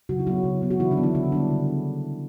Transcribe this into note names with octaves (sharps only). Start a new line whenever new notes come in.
C#3 F#3 F#4
E4
F#3 B3 F#4
C#3
F#3 B3
F#4
C#3 E3 E4
D3 D4
F#3 B3
E3 E4
C#3 E3 E4
D3 G3 B3 D4
C#3